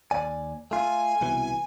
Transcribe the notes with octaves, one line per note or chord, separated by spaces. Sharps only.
D#2 D5 G#5
A3 F4 G#5
C2 B2 E3